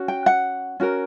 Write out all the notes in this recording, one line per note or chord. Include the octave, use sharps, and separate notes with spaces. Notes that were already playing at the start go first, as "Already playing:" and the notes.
Already playing: C#4 F#4
G5
F#5
C#4 F#4 A#4